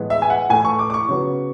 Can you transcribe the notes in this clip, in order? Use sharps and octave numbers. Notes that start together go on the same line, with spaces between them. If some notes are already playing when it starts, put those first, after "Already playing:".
Already playing: A2 E3 G#3 B3
E5
G#5
F#5
A2 E3 A3 G#5
C#6
D6
D6
C#6
C#3 F#3 B3